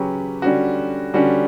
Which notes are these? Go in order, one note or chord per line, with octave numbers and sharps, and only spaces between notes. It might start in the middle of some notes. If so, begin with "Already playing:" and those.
Already playing: C#3 F#3 C#4 G4 B4
D3 G3 C#4 F#4
D3 G3 C#4 F#4